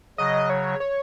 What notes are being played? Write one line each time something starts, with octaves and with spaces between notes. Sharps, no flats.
C#3 F#3 D#5
C#5
C#5